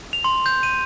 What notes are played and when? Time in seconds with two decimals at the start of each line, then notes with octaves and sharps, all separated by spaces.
0.13 F7
0.24 C6
0.46 G6
0.63 D#7